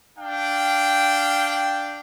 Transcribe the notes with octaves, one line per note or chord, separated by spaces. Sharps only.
D4 F5 G5